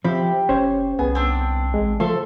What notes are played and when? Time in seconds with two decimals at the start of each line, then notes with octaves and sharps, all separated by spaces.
0.04 F3 C4 G4 E5 B5
0.49 F#1 C#4 C5 C#5
0.99 C2 B3 G#4
1.15 C4 D4
1.74 A1 G#3
2.00 C#3 F3 A3 A4 E5 C6